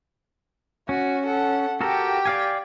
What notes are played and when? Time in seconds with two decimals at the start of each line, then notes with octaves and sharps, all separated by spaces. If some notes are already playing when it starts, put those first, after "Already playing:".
0.89 C#4 F#4
1.25 A4 F#5
1.81 F#4 G4 A4 A#4 G5
2.26 D5 F5 G#5